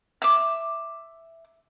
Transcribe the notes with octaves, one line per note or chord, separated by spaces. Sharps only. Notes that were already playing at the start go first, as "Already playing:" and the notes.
E5 D6